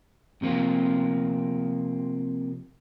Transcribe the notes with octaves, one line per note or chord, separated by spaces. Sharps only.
C3 F3 A#3 C4